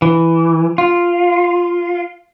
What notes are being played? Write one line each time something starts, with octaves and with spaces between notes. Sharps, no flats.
E3
F4